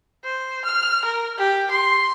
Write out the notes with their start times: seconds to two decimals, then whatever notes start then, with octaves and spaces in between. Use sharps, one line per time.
0.24 C5
0.65 F6
1.04 A#4
1.38 G4
1.71 C6